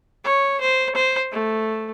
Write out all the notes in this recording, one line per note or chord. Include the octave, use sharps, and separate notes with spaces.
C#5
C5
C5
A3